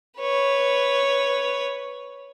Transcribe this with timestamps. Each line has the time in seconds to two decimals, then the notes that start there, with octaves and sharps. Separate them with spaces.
0.19 B4 C#5